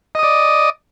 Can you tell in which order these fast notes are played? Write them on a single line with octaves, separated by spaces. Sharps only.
D#5 D#6 D5